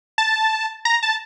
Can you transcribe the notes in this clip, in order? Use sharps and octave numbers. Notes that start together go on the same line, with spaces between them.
A5
A#5
A5